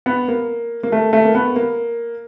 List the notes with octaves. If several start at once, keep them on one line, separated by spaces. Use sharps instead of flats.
B3
A#3
A#3
A3
A3
A#3
B3
A#3